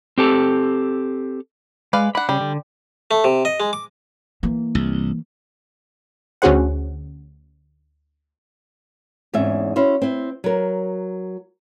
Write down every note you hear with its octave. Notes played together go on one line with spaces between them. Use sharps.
C4 G4 A4
G#3 B4 D5 F5
D4 F#5 B5
C#3 G3
D3
A3
C3
D#5
G#3
D6
E3 A#3
C2
D2 C#4 F#4 G#4 C5 F#5
E2 G#2 C4 C#4 E5
C#4 E4 F#4 C5
C4 E4
F#3 A#4